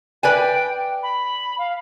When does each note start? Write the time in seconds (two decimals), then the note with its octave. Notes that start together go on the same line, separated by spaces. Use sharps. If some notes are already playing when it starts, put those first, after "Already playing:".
0.23 B4 D5 G5 G#5
1.03 B5
1.59 F5